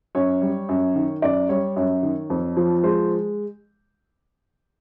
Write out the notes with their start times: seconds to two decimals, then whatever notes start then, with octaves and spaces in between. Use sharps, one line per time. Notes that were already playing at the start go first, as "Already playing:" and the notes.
0.15 F#2 C#5
0.42 G3
0.69 F#2
0.95 D#3
1.22 F#2 D5
1.49 G3 C#5
1.76 F#2 C#5
2.03 D#3
2.30 F2
2.57 F3
2.83 G#3 C5